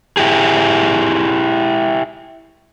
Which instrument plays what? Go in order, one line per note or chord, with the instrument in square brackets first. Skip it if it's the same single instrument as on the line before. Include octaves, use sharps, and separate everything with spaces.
[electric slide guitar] E4 G4 G#4